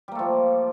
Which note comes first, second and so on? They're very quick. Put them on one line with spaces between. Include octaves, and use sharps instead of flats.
G3 A#3 A3 F3